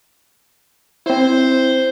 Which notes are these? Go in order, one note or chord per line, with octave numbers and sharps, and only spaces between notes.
C4 E4 C5